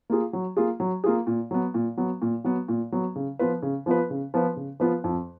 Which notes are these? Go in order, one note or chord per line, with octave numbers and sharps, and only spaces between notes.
A#3 F4 G#4
F#3
A#3 F4 G#4
F#3
A#3 F4 G#4
A#2
F#3 B3
A#2
F#3 B3
A#2
F#3 B3
A#2
F#3 B3
C#3
F3 B3 F4 B4
C#3
F3 B3 F4 B4
C#3
F3 B3 F4 B4
C#3
F3 B3 F4 B4
F2